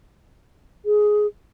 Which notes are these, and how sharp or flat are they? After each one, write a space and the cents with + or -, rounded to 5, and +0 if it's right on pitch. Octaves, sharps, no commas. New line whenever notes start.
G#4 +10